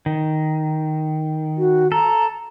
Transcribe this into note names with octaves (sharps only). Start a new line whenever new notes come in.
D#3
F#4
A4 A#5